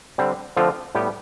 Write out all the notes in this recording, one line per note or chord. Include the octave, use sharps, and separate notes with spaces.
D3 G3 C4
D3 F3 A3 C4 F4
A2 G3 B3 G4